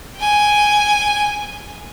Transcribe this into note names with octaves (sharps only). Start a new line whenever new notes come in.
G5 G#5